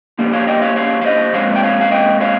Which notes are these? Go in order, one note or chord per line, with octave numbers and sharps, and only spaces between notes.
C#3 G3 A#3
C#5 F5
D#5 G5
C#5 F5
C#5 F5
F5
C5 D#5
A#2 G#3 C4 C#5 F5
G5
C#5 F5
F5
D#5 G5
C#5 F5